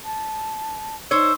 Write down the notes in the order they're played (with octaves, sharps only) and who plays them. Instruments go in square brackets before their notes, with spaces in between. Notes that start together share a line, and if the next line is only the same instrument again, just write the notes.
[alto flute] A5
[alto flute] D#4 [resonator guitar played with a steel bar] C5 C#5 [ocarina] E6